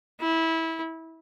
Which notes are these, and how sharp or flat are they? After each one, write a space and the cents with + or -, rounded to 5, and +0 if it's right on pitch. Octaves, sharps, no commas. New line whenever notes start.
E4 -20